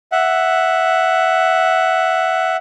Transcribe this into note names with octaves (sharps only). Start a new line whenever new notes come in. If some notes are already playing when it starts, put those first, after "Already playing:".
E5 F#5